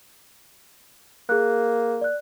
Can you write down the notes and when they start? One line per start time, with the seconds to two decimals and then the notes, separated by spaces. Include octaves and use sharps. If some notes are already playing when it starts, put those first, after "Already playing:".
1.29 A#3 G#4 F#6
2.01 D5 F#6